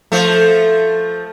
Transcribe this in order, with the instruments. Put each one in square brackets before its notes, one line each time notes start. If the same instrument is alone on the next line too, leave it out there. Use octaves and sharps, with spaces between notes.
[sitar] F3 A3